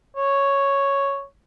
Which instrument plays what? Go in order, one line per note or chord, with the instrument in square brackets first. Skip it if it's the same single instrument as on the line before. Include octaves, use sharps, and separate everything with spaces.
[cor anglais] C#5